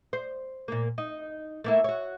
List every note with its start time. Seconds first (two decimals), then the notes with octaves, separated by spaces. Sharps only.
0.13 C5
0.68 A#2 A#3
0.98 D#4
1.64 A3 A#3 E4
1.84 F#4 C#5